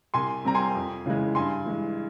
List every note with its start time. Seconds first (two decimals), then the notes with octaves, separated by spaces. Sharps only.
0.14 C2 G#5 C6
0.45 C3 G3 C4 A#5
0.55 G#5 C6
0.75 F2
1.06 C#3 E3 G#3
1.35 G2 G#5 C6
1.66 E3 G#3